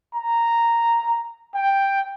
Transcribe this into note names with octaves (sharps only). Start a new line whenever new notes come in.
A#5
G5